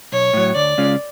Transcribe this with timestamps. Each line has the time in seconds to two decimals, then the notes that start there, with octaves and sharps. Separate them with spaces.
0.12 B1 C#5
0.33 A2 F#3
0.55 D2 D5
0.78 C#3 G#3 C#4 F4